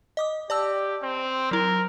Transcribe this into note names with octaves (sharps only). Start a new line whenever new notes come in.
D#5 D6 D#6
G4 D5 A5 E6
C4
F#3 E4 A#4